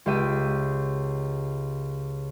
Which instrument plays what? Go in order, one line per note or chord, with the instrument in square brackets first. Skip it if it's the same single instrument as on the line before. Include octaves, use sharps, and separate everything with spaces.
[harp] C#2 G4 E5 D#7